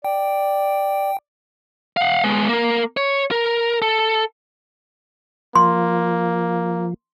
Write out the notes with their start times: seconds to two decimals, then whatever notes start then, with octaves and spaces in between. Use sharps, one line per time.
0.05 D5 G5
1.97 F5 F#5
2.24 G#3 B3
2.49 A#3 A#4
2.97 C#5
3.31 A#4
3.82 A4
5.55 F3 A#3 C6